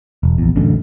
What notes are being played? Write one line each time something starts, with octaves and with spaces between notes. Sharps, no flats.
E1
A#1 E2
A1 F#2 D3